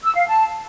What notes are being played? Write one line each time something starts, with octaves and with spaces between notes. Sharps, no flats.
E6
F5
A5